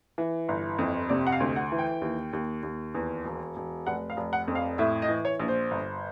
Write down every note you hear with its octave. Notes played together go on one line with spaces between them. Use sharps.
E3
G1
F2
C3 D5
F#5
F5
D2
F#5
E3
G5
D#2
D#2
D#2
E2
E1
E1
F1 F#5
F5
F1
F#5
F2
F5
A2 E5
D#5
E3
C#5
A#1
C5
G1